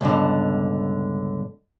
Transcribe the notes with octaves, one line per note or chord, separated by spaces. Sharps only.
C#2 G2 B2 D3